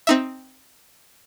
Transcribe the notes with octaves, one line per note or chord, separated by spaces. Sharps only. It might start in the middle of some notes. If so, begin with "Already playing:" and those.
C4 D#4 E5